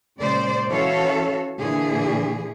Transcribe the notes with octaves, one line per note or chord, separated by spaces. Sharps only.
A#2 C#3 G#3 C5 D5
E3 C#4 F#4 A4 C#5 F5
A#2 D3 E3 G#4